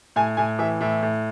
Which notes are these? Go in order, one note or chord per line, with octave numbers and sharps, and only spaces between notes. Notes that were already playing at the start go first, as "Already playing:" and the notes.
A2 G#5
A2 G#5
E3 E5
A2 E5
A2